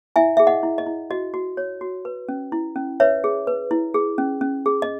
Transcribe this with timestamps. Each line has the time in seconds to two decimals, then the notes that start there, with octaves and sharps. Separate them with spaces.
0.16 E4 E5 G#5
0.37 G#4 E5
0.47 D#5 F#5
0.63 E4
0.78 D#5
0.86 E4
1.10 F#4 D#5
1.34 F#4
1.57 C#5
1.81 F#4
2.05 B4
2.29 C#4
2.52 E4
2.76 C#4
3.00 B4 C#5 E5
3.24 G#4
3.47 B4
3.71 E4
3.94 G#4
4.18 C#4
4.41 C#4
4.66 G#4
4.82 D#5